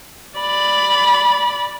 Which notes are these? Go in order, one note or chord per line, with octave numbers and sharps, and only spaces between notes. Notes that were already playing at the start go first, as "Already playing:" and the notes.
D5 B5